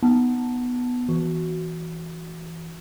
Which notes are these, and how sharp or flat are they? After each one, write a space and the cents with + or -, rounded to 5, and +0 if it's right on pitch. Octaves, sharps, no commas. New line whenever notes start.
B3 +0 D#4 +0 A5 +0
E3 -5 F#4 -5